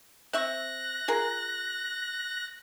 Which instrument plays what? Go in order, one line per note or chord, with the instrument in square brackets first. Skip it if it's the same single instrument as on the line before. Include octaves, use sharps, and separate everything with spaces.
[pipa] C4 E5 C#6 [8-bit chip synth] F#6 A#6
[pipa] F4 G#4 A#4